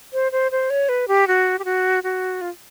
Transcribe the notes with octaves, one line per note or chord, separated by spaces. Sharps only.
C5
C5
C5
C#5
B4
G4
F#4
G4
F#4
F#4
F4